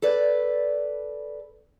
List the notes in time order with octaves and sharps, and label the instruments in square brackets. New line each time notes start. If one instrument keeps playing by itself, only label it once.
[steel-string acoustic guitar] A4 B4 D5